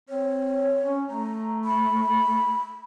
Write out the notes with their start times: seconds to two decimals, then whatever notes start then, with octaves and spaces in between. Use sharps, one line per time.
0.09 C4 C#5
0.83 C#4
1.10 A3 A#5
1.65 B5